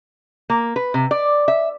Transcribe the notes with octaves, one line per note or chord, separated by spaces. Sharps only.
A#3
B4
C3
D5
E5